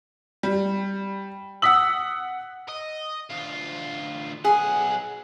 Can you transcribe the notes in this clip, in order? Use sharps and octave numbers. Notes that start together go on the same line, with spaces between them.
G3
F#5 D#6 E6 B6 F#7
D#5
D2 F4
B1 G#4 F#5